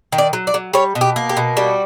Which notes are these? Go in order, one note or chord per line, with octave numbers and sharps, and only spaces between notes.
D#3
D5
F#3
D5
F#3
G3 C#5
B2
G4
A#3
G4
B2
G3 F#4